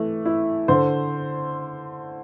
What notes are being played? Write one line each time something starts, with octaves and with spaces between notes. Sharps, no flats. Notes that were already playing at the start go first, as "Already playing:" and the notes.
Already playing: E3 A3
E4
D3 C5